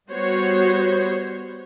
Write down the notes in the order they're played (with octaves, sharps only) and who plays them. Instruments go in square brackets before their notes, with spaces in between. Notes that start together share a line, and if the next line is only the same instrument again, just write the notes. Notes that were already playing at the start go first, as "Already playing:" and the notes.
[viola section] G3 B3 F#4 C5 C#5